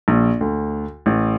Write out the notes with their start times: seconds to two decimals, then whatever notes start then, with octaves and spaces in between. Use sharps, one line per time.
0.08 A#1
0.41 D2
1.06 A1